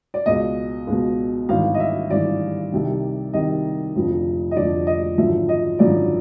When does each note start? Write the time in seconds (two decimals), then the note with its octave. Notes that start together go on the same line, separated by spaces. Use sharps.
0.14 D5
0.26 C#2 B2 D#5
0.87 C#2 B2
1.49 G#1 G2 E3 F5
1.74 D#5
1.80 E5
2.10 G#1 G2 E3 D5
2.72 C2 C3 D#3
3.33 C2 C3 D#3 D#5
3.95 F1 F2 D3 F3
4.51 D#5
4.56 F1 F2 D3 F3 D5
4.87 D#5
5.18 G#1 F#2 D3 F3 E5
5.49 D#5
5.79 G#1 F#2 D3 F3 D5